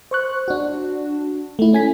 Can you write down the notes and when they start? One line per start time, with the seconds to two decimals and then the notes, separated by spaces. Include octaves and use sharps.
0.11 C5 C#6 F#6
0.48 D4 F#4
1.59 A3 E4
1.73 C#4 G#5 B6